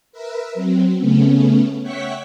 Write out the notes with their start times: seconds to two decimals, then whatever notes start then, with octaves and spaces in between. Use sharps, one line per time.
0.12 A#4 B4 E5
0.54 F#3 C4
0.97 C#3 A3 B3 C#4
1.82 C#5 E5 F#5 G5 C#6 B6